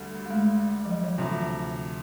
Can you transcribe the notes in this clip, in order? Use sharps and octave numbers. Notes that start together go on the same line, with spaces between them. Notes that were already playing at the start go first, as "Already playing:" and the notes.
Already playing: D2 D3 G3
A3
G#3
F3
F#3
E3
D2 C3 E3 F3